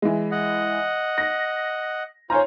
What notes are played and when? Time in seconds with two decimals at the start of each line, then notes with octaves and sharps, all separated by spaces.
0.02 E3 G#3
0.31 D#5 F#5
1.18 A#6
2.30 F4 C5 C#5 G#5 A#5